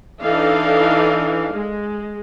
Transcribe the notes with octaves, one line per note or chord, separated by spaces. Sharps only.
E3 D4 D#4 A4 F5
G#3